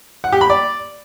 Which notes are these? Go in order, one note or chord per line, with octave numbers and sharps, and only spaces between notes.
F#5
G4
B5
D5